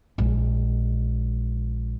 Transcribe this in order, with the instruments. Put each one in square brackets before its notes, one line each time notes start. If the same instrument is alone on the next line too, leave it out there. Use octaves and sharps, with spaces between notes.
[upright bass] A#1 G#3